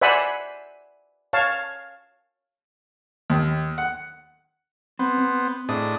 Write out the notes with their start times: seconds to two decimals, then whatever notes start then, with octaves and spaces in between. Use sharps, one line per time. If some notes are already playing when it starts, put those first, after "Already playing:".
0.01 C5 D5 E5 F#5 G#5 B5
1.33 C#5 F5 A5
3.30 D#2
3.78 F#5
4.99 B3 C4 C5
5.18 C4
5.69 A2 D4 G#4 C5 D#5 D#6